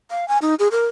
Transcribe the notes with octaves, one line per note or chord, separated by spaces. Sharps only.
F5
G#5
D#4
G#4
A#4